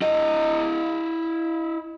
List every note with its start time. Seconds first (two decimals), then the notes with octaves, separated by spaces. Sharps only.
0.02 E4 D#5